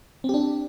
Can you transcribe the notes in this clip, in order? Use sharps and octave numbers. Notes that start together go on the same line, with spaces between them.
C4 D4 G4